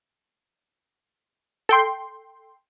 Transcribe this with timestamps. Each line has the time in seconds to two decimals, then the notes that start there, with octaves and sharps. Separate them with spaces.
1.69 A4 G5 C6